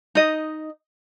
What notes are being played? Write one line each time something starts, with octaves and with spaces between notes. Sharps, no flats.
D#4 D#5